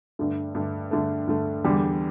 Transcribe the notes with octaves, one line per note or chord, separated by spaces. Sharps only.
G2 D3 A3
G2 D3 A3
G2 D3 A3
G2 D3 A3
E2 D3 G3